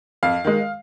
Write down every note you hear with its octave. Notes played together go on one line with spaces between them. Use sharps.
F2 F5
D#3 G#3